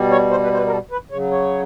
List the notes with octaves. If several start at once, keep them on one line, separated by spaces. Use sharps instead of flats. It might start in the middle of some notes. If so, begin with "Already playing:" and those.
Already playing: B2 G3
C#5
C5
B4
C5
B4
A#4
A4
B4
C#3 F#3 C#5
C#5